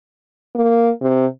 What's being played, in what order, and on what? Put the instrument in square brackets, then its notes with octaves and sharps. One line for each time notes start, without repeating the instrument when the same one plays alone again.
[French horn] A#3
C3